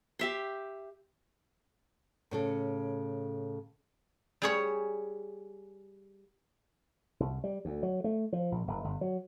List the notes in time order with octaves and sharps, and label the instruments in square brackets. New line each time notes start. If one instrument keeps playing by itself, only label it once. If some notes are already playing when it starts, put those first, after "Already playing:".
[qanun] G4 E5 C6
[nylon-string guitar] A2 C#3 A4
[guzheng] G3 G#4 C#5
[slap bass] C2
G3
D2
F#3
A3
F3
A#1
F#1
G1
F#3